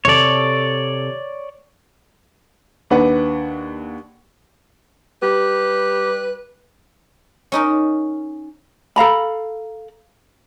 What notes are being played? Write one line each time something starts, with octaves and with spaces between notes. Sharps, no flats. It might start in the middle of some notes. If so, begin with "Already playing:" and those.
C3 A4 C#5 D5
D#2 D4 B4 F#5
G3 G4 B4
C#4 D#4 A#4
A4 F5 A#5 B5